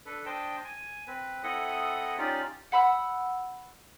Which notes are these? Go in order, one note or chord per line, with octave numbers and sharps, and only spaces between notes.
D4 A4 B4
D4 C5 D#5 G5 A5
G#5
C4 B4
C4 E4 A4 D#5 F#5 D#6
C#4 D#4 F4 G4 D5
F#5 B5 E6